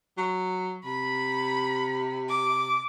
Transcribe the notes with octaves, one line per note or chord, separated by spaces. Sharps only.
F#3
C3 B5
D6